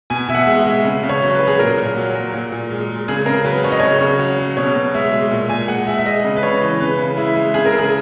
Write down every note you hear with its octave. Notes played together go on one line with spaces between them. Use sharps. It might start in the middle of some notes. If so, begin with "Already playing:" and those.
B2 G#5
B2 E5
F#5
G#3
E5
G#3
C#3
C#3
C#5
F#3
B4
F#3
G#4
A#2 A#4
A#2
F#3
F#3
A#2
A#2
G#3
G#3
C#3 G#4
C#3 A#4
F#3 B4
F#3 C#5
D#5
C#3 C#5
C#3
F#3
F#3
B2 C#5
B2
G#3 E5
G#3
A#2
A#2 G#5
G#3 F#5
G#3 E5
E5
G#3 D#5
C#3
B4
C#3 C#5
E3
C#3 B4
C#3
G#3 E4
G#3
C#3 G#4
A#4
C#3
G#4